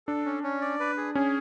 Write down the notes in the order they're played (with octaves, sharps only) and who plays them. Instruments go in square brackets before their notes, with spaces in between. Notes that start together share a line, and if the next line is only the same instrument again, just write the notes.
[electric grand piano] D4 [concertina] A4
[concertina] C#4
C#4
D5
B4
G#4
[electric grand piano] C#4 [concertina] G#4